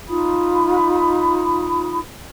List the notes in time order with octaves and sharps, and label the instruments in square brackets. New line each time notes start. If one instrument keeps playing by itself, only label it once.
[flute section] D#4 F4 B5 D#6